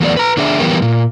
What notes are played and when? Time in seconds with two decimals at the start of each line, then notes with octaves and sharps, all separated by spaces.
0.01 E2 F#3 A3 B3 D5
0.17 B4 A#5
0.37 D3 D4 G#4 E5
0.60 E3 F#3 G3 B3 G4 A#4
0.82 A#2